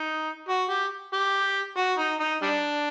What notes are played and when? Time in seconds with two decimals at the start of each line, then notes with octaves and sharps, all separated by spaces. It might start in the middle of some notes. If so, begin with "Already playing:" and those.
Already playing: D#4
0.49 F#4
0.70 G4
1.14 G4
1.78 F#4
1.98 D#4
2.20 D#4
2.42 G3 D4